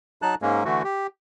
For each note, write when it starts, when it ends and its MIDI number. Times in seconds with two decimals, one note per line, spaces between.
0.22 0.35 54
0.22 0.35 63
0.22 0.35 81
0.22 0.35 90
0.42 0.64 44
0.42 0.64 56
0.42 0.64 58
0.42 0.64 61
0.65 0.82 50
0.65 0.82 52
0.65 0.82 57
0.65 0.82 66
0.84 1.07 67